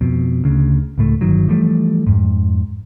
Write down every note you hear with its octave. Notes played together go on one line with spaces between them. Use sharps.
F2 B2
D2 C#3
C#2 A2 A3
G1 D#3 F#3
E3 F3 G3 A3
F2 G#2